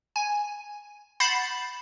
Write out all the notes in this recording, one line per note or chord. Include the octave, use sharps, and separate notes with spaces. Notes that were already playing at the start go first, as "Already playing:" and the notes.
G#5
F#5 B5 G6 A6 C7 E7